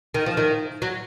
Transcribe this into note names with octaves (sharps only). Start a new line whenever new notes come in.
D#3
F3
D#3
F#3